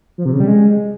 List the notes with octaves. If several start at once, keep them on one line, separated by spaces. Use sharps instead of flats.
F3
C3
C#3
G3
G#3